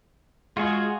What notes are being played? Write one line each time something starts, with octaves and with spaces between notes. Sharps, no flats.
G#3 F4 F#4 G#4